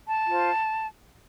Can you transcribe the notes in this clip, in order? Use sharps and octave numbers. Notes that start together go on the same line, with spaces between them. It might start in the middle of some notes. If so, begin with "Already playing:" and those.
A5
F4 C5